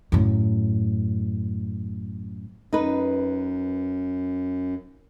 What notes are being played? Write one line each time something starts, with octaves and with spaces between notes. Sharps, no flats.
F#2 A2
F#2 D#4 B4